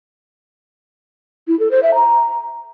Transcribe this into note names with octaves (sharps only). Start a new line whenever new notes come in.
E4
A4
C5
E5
A#5